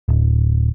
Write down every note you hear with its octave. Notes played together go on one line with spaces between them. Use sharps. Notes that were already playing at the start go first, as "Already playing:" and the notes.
D1